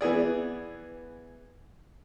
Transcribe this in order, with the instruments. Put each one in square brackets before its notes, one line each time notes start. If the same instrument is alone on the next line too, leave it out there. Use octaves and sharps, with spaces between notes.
[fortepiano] E3 B3 G#4 D5